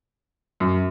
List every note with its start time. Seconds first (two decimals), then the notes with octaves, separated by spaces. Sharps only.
0.60 F#2